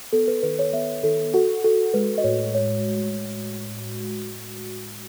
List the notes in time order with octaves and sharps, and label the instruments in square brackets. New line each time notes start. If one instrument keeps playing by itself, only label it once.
[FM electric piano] B3 [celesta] A4
[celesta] B4
[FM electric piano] D#3 [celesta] B4
[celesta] C#5
[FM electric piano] B3 [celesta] E5
[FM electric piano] D#3 [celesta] A4
[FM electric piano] F#4 [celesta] A4
[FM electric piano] F#4 [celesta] A4
[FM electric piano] G#3 [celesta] B4
[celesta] D#5
[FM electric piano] A2 [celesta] C#5
[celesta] C#5